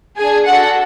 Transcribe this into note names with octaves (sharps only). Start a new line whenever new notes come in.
D4 G#4 G#5
D4 F#4 A4 F#5